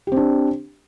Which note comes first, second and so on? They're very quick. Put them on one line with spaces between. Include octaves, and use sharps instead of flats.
G4 C4 D4